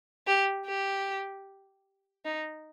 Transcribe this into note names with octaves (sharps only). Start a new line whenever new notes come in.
G4
G4
D#4